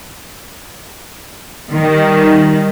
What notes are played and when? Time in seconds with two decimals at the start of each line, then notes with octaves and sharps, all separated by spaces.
1.73 D#3 G3